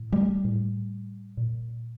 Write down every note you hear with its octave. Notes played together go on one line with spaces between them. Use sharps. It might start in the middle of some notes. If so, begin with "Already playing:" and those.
Already playing: A2
G3 A3
A2
A#2